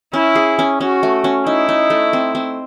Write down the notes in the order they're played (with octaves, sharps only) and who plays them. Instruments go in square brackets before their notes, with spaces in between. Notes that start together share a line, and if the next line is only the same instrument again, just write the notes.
[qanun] C#4 [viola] E4
[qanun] G#4
C#4
[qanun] C#4 [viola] F#4
[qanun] A3
C#4
[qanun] D#4 [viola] E4
[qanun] D#4
A3
C4
C4